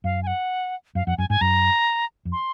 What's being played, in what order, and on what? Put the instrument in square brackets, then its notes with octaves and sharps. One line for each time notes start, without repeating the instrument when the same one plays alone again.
[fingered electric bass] F#2 [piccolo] F5
[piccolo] G#5
F#5
[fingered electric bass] F#2 [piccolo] F5
[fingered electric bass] F2 [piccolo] F#5
[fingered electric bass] F#2 [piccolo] G#5
[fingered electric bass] G#2 [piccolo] G#5
[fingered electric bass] F#2 [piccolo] A#5
[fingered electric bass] F2
[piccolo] C6